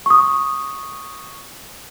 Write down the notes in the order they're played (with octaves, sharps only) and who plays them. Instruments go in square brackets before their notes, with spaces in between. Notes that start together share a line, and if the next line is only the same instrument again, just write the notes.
[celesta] C#6 D#6